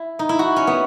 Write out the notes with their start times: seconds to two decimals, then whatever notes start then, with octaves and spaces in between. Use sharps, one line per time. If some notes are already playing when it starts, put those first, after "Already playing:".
Already playing: E4
0.19 D#4
0.29 E4
0.39 F#4
0.56 C#4
0.67 B3